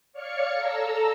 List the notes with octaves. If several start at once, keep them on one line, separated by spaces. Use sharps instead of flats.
C#5 D5 F5 C#6 F6 C#7
A4 A#5 E6